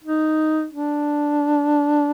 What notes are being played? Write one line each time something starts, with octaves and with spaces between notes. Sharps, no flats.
D#4
D4